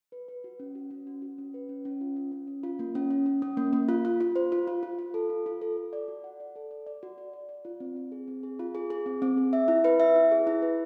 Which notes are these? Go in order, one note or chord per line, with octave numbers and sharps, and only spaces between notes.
B4
B4
F#4
C#4
F#4
C#4
F#4
F#4
C#4
B4
C#4
C#4
F4
C#4
C#4
C#4
F4
A#3
C#4
C#4
C#4
C#4
A#3
A#3
F4
F4
F4
C5
F4
F4
F4
F4
A4
F4
F4
A4
A4
D5
F#4
F#5
D5
A4
D5
D5
F#4
D5
D5
D5
F4
C4
C4
G#4
C4
G#4
F4
G#4
G#4
C4
C4
G#4
E5
E4
B4
E5
E4
G#4
E4
B4